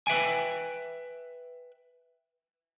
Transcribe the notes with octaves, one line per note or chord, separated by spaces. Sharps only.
B4 E5 G5 G#5